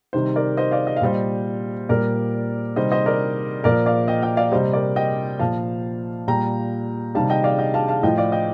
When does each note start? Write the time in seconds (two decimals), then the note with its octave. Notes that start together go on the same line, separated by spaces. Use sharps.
0.13 C3 D#3 G3 C5
0.36 A#4 D5
0.57 C5 D#5
0.71 D5 F5
0.87 D#5
0.96 F5
1.01 A#2 G3 C5 D#5
1.89 A#2 G3 A#4 D5
2.76 C3 D#3 G3 C5 D#5
2.92 C5 D#5
3.06 A#4 D5
3.64 A#2 F3 A#4 D5
3.86 D5 F5
4.08 D#5 G5
4.22 D#5 G5
4.37 D5 F5
4.52 C3 G3 C5 D#5
4.73 A#4 D5
4.96 D#5 G5
5.39 A#2 F3 F5 A5
6.28 A#2 G3 G5 A#5
7.15 C3 D#3 G3 F5 A5
7.30 D#5 G5
7.44 D5 F5
7.59 D#5 G5
7.74 F5 A5
7.88 F5 A5
8.03 A2 F3 D#5 G5
8.18 D5 F5
8.32 D#5 G5